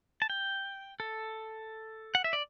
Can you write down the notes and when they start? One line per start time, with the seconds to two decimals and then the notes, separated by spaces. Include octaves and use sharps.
0.22 A5
0.30 G5
1.00 A4
2.15 F#5
2.24 E5
2.33 D5